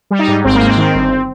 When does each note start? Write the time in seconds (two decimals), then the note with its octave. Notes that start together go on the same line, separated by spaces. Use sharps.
0.11 G3
0.19 D#4
0.28 G#2
0.44 G#1 C4
0.55 A#3
0.60 G#2
0.67 C4
0.77 D#3
0.94 G1